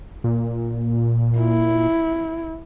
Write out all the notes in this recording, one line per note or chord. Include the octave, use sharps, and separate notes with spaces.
A#2
E4